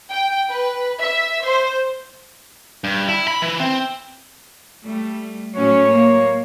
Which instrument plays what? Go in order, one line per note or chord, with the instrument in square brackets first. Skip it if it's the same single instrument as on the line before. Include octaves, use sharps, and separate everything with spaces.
[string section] G5
B4
E5
C5
[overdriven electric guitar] G2
E4
B5
E3
C4
[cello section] G3 A3
[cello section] A2 F#3 C#4 [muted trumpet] C#5
[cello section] A#3